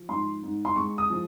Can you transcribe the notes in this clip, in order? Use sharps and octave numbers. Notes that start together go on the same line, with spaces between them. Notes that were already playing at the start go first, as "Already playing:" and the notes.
Already playing: F3
G#2 C6
G#2
C6
G#3 C#6
D#6
F3